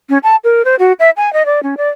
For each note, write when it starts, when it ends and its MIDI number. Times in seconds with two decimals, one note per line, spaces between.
0.10 0.18 61
0.23 0.36 81
0.44 0.62 70
0.65 0.75 72
0.79 0.93 66
1.00 1.10 76
1.17 1.32 80
1.33 1.46 75
1.46 1.63 74
1.63 1.75 61
1.77 1.89 74